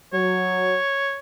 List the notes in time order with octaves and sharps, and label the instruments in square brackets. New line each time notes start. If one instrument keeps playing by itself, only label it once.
[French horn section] F#3 [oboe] C#5